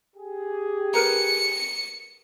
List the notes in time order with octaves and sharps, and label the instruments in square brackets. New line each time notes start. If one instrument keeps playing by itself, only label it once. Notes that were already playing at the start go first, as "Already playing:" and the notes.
[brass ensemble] G4 G#4
[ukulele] A#4 B4 A#5 [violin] C#7